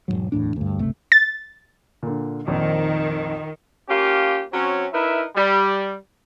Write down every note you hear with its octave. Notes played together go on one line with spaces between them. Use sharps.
E1 E2 G#2 F#3
D1 E2 A2 D4
D2 G2
G1 C#2 C3 A3
A6
A#2 D3
A#1 F2 D#3
A#3 C#4 F4 G4
F#3 C4 C#4
D#4 E4 A#4 B4 E5
G3